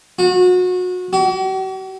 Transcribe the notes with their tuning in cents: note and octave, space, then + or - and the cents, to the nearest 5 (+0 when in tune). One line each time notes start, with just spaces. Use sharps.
F#4 -30
F#4 +45